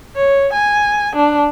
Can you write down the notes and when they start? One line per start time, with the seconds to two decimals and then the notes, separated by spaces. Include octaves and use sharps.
0.15 C#5
0.53 G#5
1.16 D4